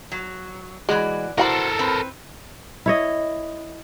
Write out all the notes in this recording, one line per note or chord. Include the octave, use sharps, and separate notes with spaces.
F#3
E3 G#3 F#4 D5
E3 F#4 A4 A#4 C5 F#5 B5
C4 B4
E4 C#5 D#5